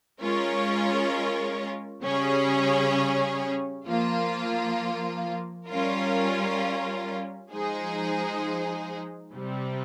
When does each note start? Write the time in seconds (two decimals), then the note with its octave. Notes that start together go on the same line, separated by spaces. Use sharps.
0.21 G#3 C#4 F4 A#4 C#5
2.03 C#3 G3 C#4 G#4 C#5
3.86 F3 A#3 F4
5.68 G3 C#4 F4 A#4
7.50 F3 G#3 D#4 G#4 C5
9.33 C3 G3 C4